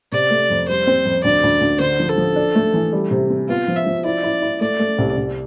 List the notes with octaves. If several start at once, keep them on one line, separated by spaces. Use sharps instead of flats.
C3 D5
A3
F2
G3 C5
C4
F2
D2 D5
D2
D2
D3 C5
F3
A4
F3
D4
A3
E3
G3
C3
C4
B3 F4
F3
E5
F3
E4 D5
E4
E4
A3 D5
A3
C2
C2